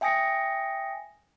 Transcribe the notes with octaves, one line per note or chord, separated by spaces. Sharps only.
E5 G5 G#5 D#6 A#6 C#7